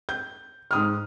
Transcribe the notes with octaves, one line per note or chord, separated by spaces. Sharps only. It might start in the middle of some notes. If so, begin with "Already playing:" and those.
G6
G#2 D#6 F6